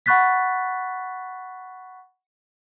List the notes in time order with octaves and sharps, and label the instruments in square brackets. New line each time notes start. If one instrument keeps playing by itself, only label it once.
[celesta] F#5 B5 C#6 F#6 A6 B6